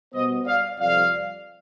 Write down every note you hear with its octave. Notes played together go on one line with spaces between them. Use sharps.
B2 G3 B3 C5 D#5
D5 F5
F2 C3 G3 D5 F5